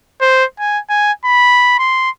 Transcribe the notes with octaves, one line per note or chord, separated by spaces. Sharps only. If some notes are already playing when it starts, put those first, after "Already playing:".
C5
G#5
G#5
B5
C6